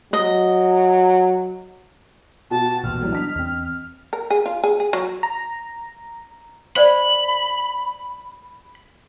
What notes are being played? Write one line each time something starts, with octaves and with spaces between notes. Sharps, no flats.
F#3 D#5
B2 F#4 G4 A5
B1 E2 A#2 F6
E3 F#3 G3
D4 D#5 B6 F7
E2 C4
A#4
G#4
F4
G#4
G#4
F#3
A#5
C5 D5 B5